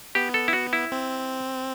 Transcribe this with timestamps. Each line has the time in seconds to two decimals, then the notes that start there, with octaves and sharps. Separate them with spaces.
0.15 B3 G4
0.34 A4
0.48 E4
0.53 F#4
0.73 E4
0.92 C4